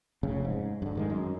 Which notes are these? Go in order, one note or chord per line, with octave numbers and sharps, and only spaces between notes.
F1 C#3
G#2
G2 D3
G#2 D#3 G#3
F#2